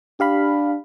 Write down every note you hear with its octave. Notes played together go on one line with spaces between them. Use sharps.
D4 G4 F5 B5